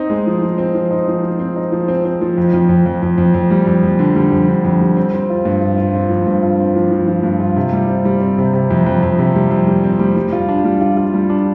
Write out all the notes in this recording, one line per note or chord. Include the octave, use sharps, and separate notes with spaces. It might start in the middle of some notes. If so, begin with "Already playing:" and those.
Already playing: C4 D#4
G#3
F3
F3
C4
F3
D#4
F3
F3
C4
D#4
F3
C4
C4
F3
F2
F2
F2
F2
F2
F2
F2
G3
F2
F2
D3
G3
F2
D3
F2
G3
C4
C4
F4
G2
F4
F4
C4
F3
G2
F4
C4
F3
F3
F3
G2
F4
C3
G3
C4
G3
C4
C3
C3
F2
F2
F2
C3
G3
F2
G3
C4
G3
G3
F4
D4
G3
F4
F4
G3
D4